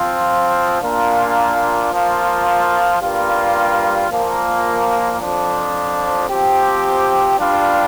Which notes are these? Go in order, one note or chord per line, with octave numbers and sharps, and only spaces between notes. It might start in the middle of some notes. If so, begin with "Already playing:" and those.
Already playing: F3 C4 F4
A#2 A#3 D4 F4
F3 A#3 F4
G2 G3 A#3 F4
A#2 F3 A#3
F2 F3 D4
F3 C4 G4
G2 G3 D4 F4